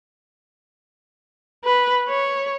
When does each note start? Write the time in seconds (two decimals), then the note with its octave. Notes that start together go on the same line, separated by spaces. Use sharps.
1.64 B4
2.09 C#5